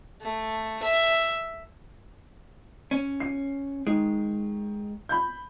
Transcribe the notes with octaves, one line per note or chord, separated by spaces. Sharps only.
A3
E5
C#4
C7
D#3 G#3
B5 G6